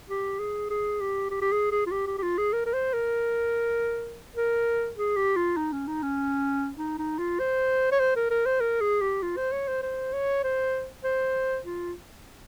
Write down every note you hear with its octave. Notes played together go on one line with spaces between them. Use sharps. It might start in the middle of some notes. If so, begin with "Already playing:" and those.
G4
G#4
G#4
G4
G4
G4
G#4
G#4
F4
G4
G4
G4
F4
G#4
A#4
A#4
C5
A#4
A#4
G#4
G4
F4
D#4
C#4
D#4
C#4
D#4
D#4
F4
C5
C#5
C5
A#4
A#4
C5
A#4
G#4
G4
F4
C5
C#5
C5
C5
C#5
C5
C5
F4